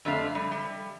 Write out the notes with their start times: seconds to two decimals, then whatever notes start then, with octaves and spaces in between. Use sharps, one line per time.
0.05 F2 D3 A3 F5
0.35 G3
0.52 G3